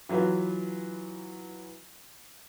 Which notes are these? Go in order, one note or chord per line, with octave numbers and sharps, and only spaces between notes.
E3 F#3 F4 B4